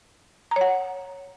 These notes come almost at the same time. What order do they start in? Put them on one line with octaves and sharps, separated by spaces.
A#5 C#5 F#5